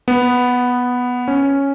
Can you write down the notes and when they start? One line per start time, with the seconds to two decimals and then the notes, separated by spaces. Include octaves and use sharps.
0.08 B3
1.28 C#4